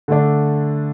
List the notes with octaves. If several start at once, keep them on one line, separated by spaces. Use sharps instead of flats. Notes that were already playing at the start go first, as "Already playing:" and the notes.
D3 A3 D4